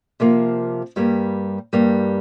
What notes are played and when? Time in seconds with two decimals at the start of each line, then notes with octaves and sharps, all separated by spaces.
0.20 C3 F3 A#3
0.96 G2 G3 A#3
1.73 G2 G3 A#3